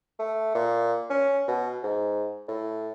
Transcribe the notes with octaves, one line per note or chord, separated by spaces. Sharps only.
A3
A#2
C#4
B2
G#2
A2